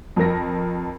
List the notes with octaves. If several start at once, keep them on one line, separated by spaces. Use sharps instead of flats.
F2 F3 A#4 A#6